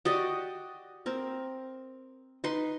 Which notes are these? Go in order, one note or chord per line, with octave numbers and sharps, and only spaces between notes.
F#4 G4 D5 D#5
C4 A#4
D#4 B4 C6